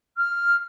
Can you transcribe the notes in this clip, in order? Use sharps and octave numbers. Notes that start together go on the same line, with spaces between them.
F6